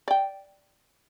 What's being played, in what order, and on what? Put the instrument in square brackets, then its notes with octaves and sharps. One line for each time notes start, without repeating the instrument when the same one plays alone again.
[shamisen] D5 G5